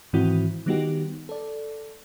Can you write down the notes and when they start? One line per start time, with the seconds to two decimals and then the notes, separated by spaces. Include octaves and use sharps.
0.13 G#2 D#3 E3 C4 E4 F#4
0.66 D#3 G3 B3 D#4 F#4 G4
1.29 A4 D5